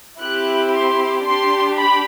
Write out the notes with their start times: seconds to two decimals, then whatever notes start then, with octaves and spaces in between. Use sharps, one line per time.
0.20 C4 E4 G4 F#6
0.72 C6
1.25 D4 G4 C6
1.77 B5